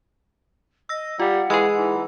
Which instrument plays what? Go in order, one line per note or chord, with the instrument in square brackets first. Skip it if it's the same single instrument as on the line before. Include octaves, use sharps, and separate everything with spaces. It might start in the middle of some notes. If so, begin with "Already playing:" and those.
[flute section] D#5 [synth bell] E6 A#6
[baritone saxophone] G3 [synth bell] F4 [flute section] F5 F#5
[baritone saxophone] E3 [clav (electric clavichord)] G#3 G#4 [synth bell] B5 C6 E6
[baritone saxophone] E3 [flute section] D#4 F#5